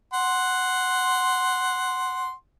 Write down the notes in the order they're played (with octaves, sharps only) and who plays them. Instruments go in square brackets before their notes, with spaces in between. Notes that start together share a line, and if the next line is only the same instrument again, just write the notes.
[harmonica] F#5 C6